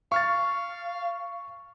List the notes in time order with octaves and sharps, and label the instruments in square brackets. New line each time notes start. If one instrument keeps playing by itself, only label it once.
[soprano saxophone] F5 [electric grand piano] C#6 F6 A6